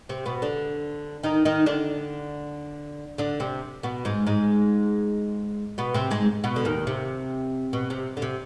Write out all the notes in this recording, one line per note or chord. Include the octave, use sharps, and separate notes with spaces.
C3 C4
B2 B3
D3 D4
D#3 D#4
D#3 D#4
D3 D4
D3 D4
C3 C4
B2 B3
G#2 G#3
G#2 G#3
B2 B3
C3 C4
G#2 G#3
B2 B3
D3
D#2 D#3
C3
B2
C3
D3
C3